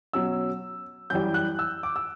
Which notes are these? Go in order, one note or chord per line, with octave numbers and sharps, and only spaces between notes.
B2 F#3 C#4 E6
F#2 E3 G3 G6
F#6
E6
D6
E6